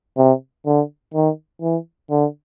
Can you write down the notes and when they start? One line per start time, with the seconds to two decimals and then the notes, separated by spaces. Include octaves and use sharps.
0.18 C3
0.66 D3
1.14 D#3
1.62 E3
2.11 D3